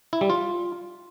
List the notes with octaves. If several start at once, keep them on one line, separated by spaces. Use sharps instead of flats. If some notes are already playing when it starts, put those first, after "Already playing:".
E4
G3
F4